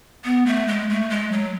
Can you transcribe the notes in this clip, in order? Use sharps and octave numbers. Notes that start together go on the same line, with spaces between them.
B3
A3
G#3
A3
G#3
F#3